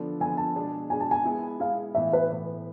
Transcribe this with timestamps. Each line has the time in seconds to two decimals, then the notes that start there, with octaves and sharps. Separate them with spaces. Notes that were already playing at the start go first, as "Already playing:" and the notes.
Already playing: D3 F3 B3 D4 A4
0.20 D3 F3 B3 D4 A4 G#5
0.37 A5
0.56 B2 G#3 D4 G#4
0.90 B2 G#3 D4 G#4 G#5
1.00 A5
1.11 G#5
1.25 G#3 B3 E4
1.60 G#3 B3 E4 F5
1.95 A2 E3 B3 E5
2.13 B4
2.30 A2 E3 B3